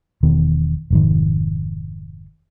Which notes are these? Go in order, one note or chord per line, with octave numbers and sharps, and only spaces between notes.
E1 D#3 B3
F1 G#2 D#3